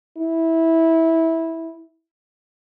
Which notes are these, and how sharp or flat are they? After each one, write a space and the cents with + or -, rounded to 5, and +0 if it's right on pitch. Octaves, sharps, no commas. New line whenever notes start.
E4 -15